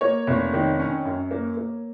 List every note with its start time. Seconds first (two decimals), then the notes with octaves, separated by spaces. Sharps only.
0.01 A#3 C#5
0.27 F1
0.53 D#3
0.79 C#4
1.05 F#2
1.31 A#3
1.57 A#3